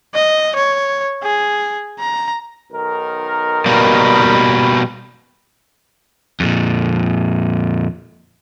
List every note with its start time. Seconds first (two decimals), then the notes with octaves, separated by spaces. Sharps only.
0.15 D#5
0.55 C#5
1.23 G#4
2.00 A#5
2.72 B1 D#3 A#4
3.66 B2 G3 A#3 B5
6.40 F2 A#2